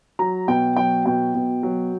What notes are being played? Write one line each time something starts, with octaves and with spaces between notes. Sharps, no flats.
F#3 A#5
B2 G5
F#3 G5
B2 G5
B2
F#3